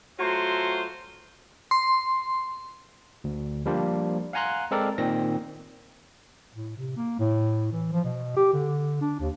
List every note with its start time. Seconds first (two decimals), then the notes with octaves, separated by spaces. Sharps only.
0.19 F#3 A3 F4 F#4 C5
1.71 C6
3.24 D2
3.66 F3 G3 A#3 D4 C5
4.33 F5 F#5 G#5 A#5 C6 F#6
4.71 G#3 C4 A4 A#4 D5
4.98 A#2 D#3 C4 A#6
6.54 A2
6.77 C3
6.97 A#3
7.19 A2
7.72 E3
7.92 F3
8.04 B2
8.36 G4
8.53 D3
9.01 D4
9.20 D#2